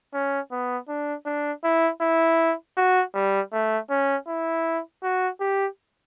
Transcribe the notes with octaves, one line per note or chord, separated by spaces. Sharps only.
C#4
B3
D4
D4
E4
E4
F#4
G3
A3
C#4
E4
F#4
G4